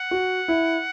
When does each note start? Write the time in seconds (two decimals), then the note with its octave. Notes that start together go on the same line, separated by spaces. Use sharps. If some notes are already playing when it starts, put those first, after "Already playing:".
Already playing: F#5
0.11 F#4
0.48 E4